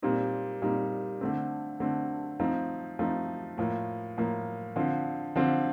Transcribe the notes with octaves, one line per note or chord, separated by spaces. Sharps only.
A#2 G3 C4 D#4
A#2 G3 C4 D#4
D3 A3 C4
D3 A3 C4
F3 A3 C4 D#4
F3 A3 C4 D#4
A2 F3 A#3
A2 F3 A#3
D3 F3 C4
D3 F3 C4